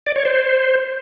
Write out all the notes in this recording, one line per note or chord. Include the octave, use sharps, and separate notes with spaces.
D5
C#5
C5